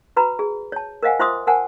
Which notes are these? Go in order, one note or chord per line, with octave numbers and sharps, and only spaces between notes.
F#4 B4 A#5 B5
G#4
C#5 A5
A#4 C5 D#5 F5 F#5 G#5
F4 C5 E5 C6 D6 D#6
A#4 C5 F#5 G#5 A5